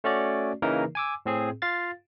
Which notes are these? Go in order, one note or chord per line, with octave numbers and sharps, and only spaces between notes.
A3 C#4 F#4 D5
C#3 E3 A#3 D#4 A#4
G#5 D6 E6
A2 C4 G#4
F4 F5 A6